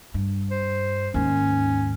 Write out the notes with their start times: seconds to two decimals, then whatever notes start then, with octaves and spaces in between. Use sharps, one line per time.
0.14 G2
0.51 C5
1.14 D#2 G#2 C#4